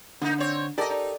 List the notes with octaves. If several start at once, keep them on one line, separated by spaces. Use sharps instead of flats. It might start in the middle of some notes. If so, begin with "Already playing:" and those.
D3 A#3 D#4
C4 C#5
G4 A4 A#4 D5 D#5
D#4